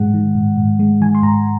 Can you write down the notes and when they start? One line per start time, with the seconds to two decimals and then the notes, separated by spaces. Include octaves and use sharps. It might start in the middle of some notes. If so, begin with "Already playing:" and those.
Already playing: G#2 G#3 F#5
0.14 D#3
0.35 G#2
0.57 G#2
0.79 G#3
1.01 D#3 G#5
1.15 C6
1.23 G#2 A#5